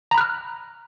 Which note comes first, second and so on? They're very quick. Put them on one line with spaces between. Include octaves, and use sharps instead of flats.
A#5 B5 F#6 F6